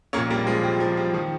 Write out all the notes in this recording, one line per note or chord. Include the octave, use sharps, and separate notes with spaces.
A#1 A#2 A#3 C#4
G3 A#3
F3 G#3
G3
F3
G3
D#3 F3